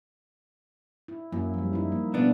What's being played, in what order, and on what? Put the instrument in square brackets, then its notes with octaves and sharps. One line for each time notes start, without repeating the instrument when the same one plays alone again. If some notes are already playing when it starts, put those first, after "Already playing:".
[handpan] E4
[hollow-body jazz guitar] F#2 [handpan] A#3 E4
[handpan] F3 G3
D#4 E4
A#3
[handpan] B2 A3 C4 [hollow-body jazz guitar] B3 D4